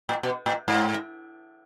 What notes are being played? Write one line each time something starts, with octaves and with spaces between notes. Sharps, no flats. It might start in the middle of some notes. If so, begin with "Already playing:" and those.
A2
B2
A2
G#2